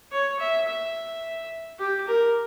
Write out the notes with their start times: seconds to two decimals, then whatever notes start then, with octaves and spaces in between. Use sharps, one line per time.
0.11 C#5
0.40 E5
0.67 E5
1.79 G4
2.07 A#4